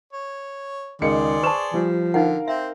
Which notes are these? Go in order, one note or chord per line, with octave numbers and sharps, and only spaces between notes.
C#5
C#2 D#3 G#4 D5 C6 C#7
B4 C5 A5 C#6 E7
F3 G3
D3 D#4 A#4 F5 F#5
C4 C5 E5